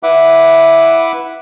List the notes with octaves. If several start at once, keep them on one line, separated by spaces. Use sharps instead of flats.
E4 B4 E5 F#5 D6